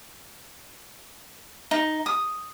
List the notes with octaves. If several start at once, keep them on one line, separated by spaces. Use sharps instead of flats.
D#4
D#6